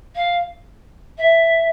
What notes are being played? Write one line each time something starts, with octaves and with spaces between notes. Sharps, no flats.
F5
E5